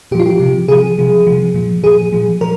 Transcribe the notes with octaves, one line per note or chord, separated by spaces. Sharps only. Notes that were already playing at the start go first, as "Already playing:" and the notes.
A#2 F3 F4 G4
G4
C3 F3
C3 F3 G#4
C3 F3
C3 F3
A#2 F3
A#2 F3 G#4
A#2 F3
F3 A#4